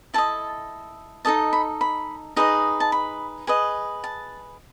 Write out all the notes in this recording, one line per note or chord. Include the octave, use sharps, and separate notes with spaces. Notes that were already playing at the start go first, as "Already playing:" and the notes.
E4 A4 D#5 A5
D#4 A4 D#5 A5
B5
B5
D#4 G#4 B4 D#5
A5
B5
G#4 B4 D#5
A5